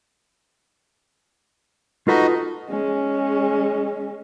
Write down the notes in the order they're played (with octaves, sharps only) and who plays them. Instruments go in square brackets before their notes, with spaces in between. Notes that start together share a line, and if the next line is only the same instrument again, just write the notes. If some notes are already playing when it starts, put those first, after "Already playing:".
[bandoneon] D#4 F#4 D#5 [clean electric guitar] F4 A4 B4
[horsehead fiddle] G#3 C#4